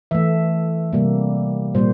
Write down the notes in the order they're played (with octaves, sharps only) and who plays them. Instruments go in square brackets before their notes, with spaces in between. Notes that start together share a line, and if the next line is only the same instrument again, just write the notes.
[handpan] E3 A3 E5
C3 G3 A#3
A#2 G3 A#3 C5